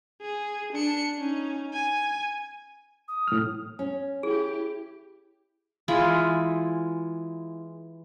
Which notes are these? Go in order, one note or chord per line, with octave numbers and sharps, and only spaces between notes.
G#4
D4 C#7
C#4 D#4
G#5
D#6
A2 F6
C#4
E4 G4 G#4
E3 G#3 E4 F4